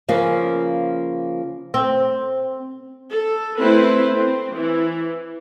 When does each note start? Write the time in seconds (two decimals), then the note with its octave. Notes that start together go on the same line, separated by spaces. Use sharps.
0.09 C#3 F3 A#3 C#4 B4 F5
1.74 C4
3.11 A4
3.59 A3 C4 E4 B4 C5
4.14 C4
4.54 E3